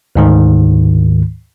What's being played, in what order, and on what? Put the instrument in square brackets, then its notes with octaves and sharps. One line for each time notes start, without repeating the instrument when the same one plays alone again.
[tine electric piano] D2 G#2 D#3